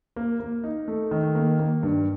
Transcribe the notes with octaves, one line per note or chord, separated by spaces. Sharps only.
A#3
A#3
D#4
A3
D#3
A#3
A#3
G2